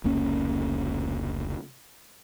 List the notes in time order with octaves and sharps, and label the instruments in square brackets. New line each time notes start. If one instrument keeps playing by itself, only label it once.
[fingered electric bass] F1 C#2 A#3 C#4